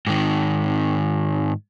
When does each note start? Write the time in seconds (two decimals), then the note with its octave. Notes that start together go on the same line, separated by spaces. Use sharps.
0.07 G#2 D#3